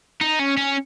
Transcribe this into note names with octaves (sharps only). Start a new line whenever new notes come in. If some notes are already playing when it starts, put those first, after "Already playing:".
D#4
C#4
C#4